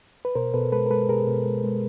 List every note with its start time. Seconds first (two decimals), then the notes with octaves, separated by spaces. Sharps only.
0.25 B4
0.35 B2 A#4 C5
0.54 B2 A4 B4
0.72 G#3 A4 B4
0.86 A#4
0.90 G#3 A4 B4
1.09 B2 G#4 A#4
1.27 B2
1.46 G#3
1.64 G#3